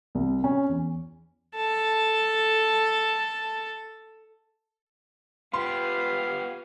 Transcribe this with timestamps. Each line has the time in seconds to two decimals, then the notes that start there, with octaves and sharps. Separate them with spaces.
0.15 C2
0.44 C#4
0.69 E2
1.56 A4 A5
5.54 B3 F4 G4 B4 F5 C6